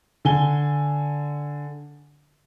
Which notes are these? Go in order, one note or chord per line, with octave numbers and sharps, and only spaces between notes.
D3 G#5 G7